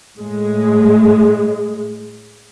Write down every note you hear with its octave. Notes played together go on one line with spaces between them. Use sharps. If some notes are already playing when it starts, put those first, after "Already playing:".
A2 G#3